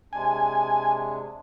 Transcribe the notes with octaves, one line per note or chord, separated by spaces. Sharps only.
C3 G#3 D4 G#5